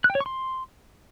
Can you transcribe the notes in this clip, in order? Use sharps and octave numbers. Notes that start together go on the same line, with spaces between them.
F#6
G5
C#5
C#6
C6